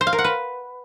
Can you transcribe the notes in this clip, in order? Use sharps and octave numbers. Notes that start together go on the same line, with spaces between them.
C5
F5
A#4
F#5
B4